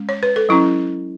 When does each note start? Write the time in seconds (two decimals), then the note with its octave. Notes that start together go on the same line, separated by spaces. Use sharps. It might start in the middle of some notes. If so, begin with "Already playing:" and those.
Already playing: G#3 C#4
0.09 C#5
0.23 B4
0.36 A4
0.49 F#3 C#4 E4